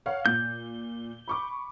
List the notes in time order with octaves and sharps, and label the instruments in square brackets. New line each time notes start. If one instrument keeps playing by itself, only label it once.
[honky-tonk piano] C#5 F5 F#5
[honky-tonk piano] A#2 [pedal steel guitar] G6
[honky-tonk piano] B5 C#6 D6